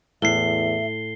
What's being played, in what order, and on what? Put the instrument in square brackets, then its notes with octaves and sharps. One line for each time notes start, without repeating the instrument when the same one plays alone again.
[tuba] E2 [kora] A2 [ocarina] E5 [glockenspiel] C7 G7